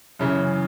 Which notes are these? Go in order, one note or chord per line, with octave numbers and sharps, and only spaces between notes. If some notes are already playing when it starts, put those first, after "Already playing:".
F#2 C#3 E3